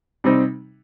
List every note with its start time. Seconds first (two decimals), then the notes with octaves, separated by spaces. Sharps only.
0.24 C3 G3 C4 D#4